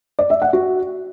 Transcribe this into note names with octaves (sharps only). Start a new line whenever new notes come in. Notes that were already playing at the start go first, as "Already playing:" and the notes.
D5
E5
F#5
F#4